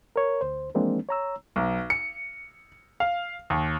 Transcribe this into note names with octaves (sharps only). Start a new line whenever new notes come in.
A#4 C#5
D2 C5
E3 F3 G#3 A#3 C4 D4
C#5 A#5 E6
B1
C#7
F5
D#2